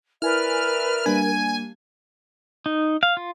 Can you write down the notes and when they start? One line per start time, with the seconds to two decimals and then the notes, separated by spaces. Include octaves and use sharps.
0.22 E4 A#4 B4 D5 E5 G#5 F6
1.06 G3 A#3 D4 G#5
2.66 D#4
3.03 F5
3.17 F4